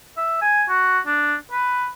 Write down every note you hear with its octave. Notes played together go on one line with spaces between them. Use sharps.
E5
G#5
F#4
D4
B4